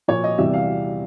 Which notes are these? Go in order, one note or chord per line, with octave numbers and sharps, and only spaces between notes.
A#2 F3 C#5
D#5
E2 C3 E3 G3 E5
F5